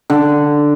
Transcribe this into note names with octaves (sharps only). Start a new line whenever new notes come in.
D3